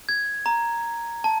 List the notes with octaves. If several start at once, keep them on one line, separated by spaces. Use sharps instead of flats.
G#6
A#5
A5